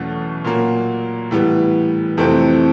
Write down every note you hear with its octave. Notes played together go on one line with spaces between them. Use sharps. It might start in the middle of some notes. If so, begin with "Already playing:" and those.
Already playing: E2 B2 F#3 A3 C#4
A#2 F#3 A#3
A2 E3 G3 B3
F2 C3 E3 A3 C4